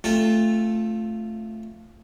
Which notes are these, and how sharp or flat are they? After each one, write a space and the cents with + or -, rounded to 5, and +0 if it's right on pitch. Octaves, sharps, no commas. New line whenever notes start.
A3 +0 C4 +30 F4 -5